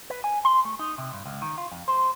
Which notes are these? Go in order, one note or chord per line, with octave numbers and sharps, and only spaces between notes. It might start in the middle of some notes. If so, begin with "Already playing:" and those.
B4
G#5
C6
A3
D#4
C3
G2
C#2
D#3
F4
F2
C5